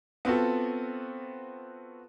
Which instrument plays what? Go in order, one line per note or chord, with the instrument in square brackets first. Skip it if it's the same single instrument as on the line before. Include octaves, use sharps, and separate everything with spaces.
[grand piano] B3 C4 F4 F#4 A4